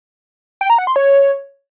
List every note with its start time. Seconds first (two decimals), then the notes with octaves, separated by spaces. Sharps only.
0.61 G5
0.70 A#5
0.78 F#5
0.87 C6
0.96 C#5